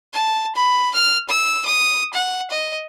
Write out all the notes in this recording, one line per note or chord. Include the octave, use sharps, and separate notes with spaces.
A5
B5
F6
E6
D#6
F#5
D#5